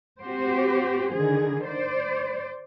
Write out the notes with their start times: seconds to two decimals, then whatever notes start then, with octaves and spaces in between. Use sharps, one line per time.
0.22 C4 F#4 G4 C5
1.12 D3 D#3 G#4
1.64 C5 D5